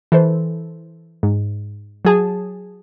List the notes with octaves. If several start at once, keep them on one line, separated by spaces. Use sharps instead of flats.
E3 A4 C5
G#2
F#3 G#4 A5